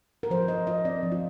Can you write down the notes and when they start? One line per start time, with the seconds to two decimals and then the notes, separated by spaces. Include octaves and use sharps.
0.23 A#4
0.30 F3 C5
0.48 F3 D#5
0.67 F4 D#5
0.85 C4 D5
1.03 F3
1.12 F4